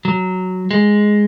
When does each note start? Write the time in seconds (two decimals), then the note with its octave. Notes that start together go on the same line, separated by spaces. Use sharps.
0.05 F#3
0.71 G#3